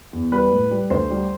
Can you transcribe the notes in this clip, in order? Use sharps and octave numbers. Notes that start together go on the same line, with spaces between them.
E2
G3 B4
A2
G3
D2 C5
G3